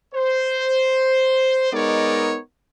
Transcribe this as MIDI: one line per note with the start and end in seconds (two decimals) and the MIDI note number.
0.15 1.71 72
1.73 2.37 56
1.73 2.37 59
1.73 2.37 63
1.73 2.37 70
1.73 2.37 73
1.73 2.37 74